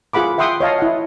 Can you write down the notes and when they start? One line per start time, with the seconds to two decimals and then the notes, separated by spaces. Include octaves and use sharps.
0.13 F4 G#4 F#5 B5 D6
0.38 E5 F#5 G5 C6 D#6
0.60 C#5 D#5 F5 A5
0.79 E4 F#5